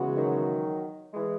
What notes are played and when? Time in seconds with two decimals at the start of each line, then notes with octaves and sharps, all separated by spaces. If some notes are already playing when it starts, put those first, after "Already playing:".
Already playing: C#3 E3 G#3 B3 F#4
0.16 D#3 F#3
1.13 E3 G#3